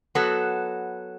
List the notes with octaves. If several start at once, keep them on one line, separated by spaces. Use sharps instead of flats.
F#3 B3 F#4 A4